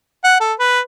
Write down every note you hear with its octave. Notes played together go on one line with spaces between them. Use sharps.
F#5
A4
B4